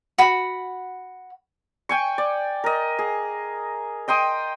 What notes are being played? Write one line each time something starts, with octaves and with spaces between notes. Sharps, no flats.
F#4 B5
G5 G#5 C#6
D5
A#4 D#5
G#4
D#5 G5 C6 D#6